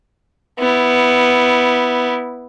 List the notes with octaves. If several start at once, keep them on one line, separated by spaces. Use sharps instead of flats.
B3 E4